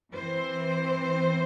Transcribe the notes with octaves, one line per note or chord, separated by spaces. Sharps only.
E3 C4 C5